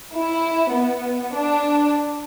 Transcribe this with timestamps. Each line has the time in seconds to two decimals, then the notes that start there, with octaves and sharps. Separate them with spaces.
0.16 E4
0.72 B3
1.36 D4